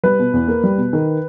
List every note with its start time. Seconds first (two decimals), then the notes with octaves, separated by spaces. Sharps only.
0.03 G3 B4
0.19 B2
0.34 E2
0.48 A#3
0.63 G3
0.78 B2
0.93 D#3